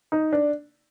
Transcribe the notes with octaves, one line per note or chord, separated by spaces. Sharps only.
D#4
D4